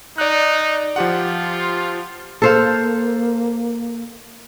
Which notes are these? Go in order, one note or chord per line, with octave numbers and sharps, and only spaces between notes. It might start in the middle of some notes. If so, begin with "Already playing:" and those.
D#4 D5 F#6
F3 F4 G4 F#5
A#3 A4 C5 F5